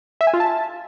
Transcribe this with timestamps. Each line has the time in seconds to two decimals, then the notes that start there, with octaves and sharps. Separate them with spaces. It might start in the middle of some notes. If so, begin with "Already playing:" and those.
0.21 E5
0.27 G#5
0.34 F4
0.40 A5